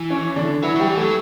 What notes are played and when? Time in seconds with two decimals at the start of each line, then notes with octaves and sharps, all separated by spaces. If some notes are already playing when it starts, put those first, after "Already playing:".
Already playing: E3
0.10 C#4
0.36 D3 D4
0.63 E3 F#3 E4
0.76 F#3 G3 G4
0.88 E3
0.97 F#3 A3 A4